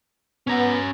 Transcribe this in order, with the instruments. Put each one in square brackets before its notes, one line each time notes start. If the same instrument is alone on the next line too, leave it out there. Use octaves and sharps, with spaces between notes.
[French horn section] B3 [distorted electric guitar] C#4 A#5